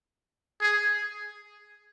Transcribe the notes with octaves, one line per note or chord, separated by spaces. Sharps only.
G#4